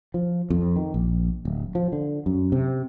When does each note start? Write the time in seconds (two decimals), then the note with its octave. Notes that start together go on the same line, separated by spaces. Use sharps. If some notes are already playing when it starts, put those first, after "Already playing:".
0.14 F3
0.50 F2
0.76 D#3
0.94 A#1
1.45 D1
1.75 F3
1.92 D3
2.26 F#2
2.52 C3